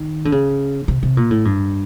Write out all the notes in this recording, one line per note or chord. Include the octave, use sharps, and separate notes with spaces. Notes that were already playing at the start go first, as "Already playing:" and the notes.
Already playing: D#3
D3
C#3
C3
C3
A#2
A2
G2